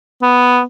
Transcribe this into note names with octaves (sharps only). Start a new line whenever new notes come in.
B3